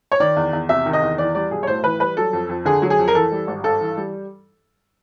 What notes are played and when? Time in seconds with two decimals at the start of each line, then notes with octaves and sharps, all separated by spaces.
0.12 C#5
0.20 D#3 D5
0.36 E2
0.53 E2
0.69 C3 E5
0.86 D#3
0.93 D#5
1.02 E2
1.18 E3 D5
1.35 G3 D5
1.51 B1 G#4
1.63 C#5
1.67 A2 C5
1.84 E3 B4
2.00 G3 B4
2.17 F#3 A4
2.33 F2
2.49 F2
2.65 D3 G#4
2.82 F#3
2.90 G#4
2.98 F2
3.08 A#4
3.15 E3 A4
3.32 G3
3.47 G#1
3.64 G2 A4
3.81 E3
3.97 G3